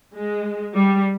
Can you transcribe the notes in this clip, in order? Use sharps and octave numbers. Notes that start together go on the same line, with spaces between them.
G#3
G3